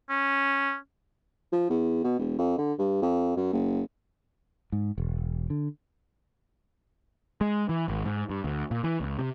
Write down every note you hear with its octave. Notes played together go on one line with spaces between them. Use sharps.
C#4
F3
E2
B2
E1
F2
D3
G2
F2
F#2
F#1
G#2
E1
D3
G#3
E3
G#1
G#2
G2
D2
A#2
E3
C#2
C3